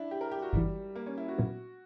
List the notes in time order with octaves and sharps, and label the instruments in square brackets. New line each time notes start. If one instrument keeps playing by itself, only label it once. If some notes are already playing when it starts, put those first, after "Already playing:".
Already playing: [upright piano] D4 E4
G4
A#4
G4
F#4
[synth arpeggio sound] G1 G2 E3 [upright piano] G3
[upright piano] A#3
C#4
E4
F#4
[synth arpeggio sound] A#2 F#3 B3